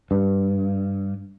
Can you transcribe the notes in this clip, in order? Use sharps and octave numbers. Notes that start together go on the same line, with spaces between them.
G2